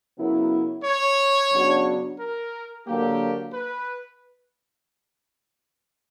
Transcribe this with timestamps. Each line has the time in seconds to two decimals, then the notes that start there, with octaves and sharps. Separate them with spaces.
0.17 C#3 F#3 B3 E4 A#4
0.85 C#5
1.52 C#3 F#3 B3 D4 F#4
2.20 A#4
2.87 D3 F#3 A#3 G4
3.54 B4